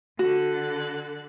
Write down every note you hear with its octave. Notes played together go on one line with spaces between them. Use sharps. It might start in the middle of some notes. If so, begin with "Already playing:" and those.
D3 F#4 A4 F#6